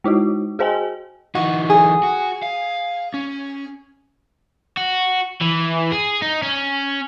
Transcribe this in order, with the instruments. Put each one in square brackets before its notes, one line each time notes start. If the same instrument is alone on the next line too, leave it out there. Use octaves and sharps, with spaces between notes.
[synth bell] G#3 D#4 E4 F#4
F#4 G#4 C5 D#5 G5 G#5
[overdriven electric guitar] E3 D#4 [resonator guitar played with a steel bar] F#4
[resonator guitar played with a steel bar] G#4
[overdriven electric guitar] F#4
F5
C#4
F#4
E3
G#4
D#4
C#4